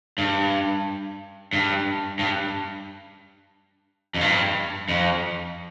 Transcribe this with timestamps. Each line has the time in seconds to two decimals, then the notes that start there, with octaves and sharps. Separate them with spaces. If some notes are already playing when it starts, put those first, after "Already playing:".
0.18 G2
1.53 G2
2.19 G2
4.14 F2
4.21 G2
4.88 F2